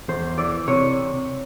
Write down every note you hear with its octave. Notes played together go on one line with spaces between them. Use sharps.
E2 C5
E3 D5
C3 C#5